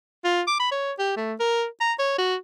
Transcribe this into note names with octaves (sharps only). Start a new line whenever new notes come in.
F4
D6
B5
C#5
G4
A3
A#4
A#5
C#5
F#4